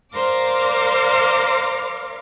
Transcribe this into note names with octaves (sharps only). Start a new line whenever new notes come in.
A#4 C5 D5 F5 C6 D6